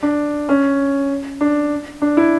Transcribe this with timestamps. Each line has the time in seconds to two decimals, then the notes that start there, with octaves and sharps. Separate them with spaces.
0.03 D4
0.49 C#4
1.41 D4
2.02 D4
2.17 E4